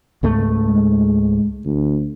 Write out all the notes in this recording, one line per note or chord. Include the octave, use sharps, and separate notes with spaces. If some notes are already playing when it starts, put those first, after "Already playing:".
C#2 G#2 A3
G#3
D2